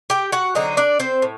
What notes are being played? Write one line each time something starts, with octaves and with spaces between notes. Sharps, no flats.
G4 G5
F#4 F#5
D3 F#3 C4 D#4 D#5
D4 D5
C4 C5
A2